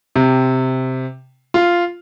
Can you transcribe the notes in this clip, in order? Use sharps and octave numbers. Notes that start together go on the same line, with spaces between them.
C3
F4